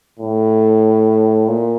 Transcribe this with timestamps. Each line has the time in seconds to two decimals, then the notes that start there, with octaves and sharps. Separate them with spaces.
0.19 A2
1.48 A#2